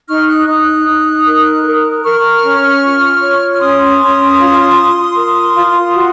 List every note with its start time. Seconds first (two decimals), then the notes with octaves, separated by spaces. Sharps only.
0.08 D#4 C#6 F6
0.28 D#6 F#6
0.47 D#4 D#6 F#6
0.87 D#4
1.26 A#4
1.65 A#4
2.03 A#4 C#6 F6
2.43 C#4
2.82 F4
3.20 C#5
3.53 F6
3.59 C#4 C6 D#6
3.99 C#4
4.37 F4
4.77 F4
5.15 A#4
5.54 F4
5.94 F#4